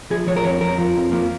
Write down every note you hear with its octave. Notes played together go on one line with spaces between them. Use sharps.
F3 G#4
F3 C#5
A#4
F2 C#5
F2 A#4
F3
F2
F3 A#3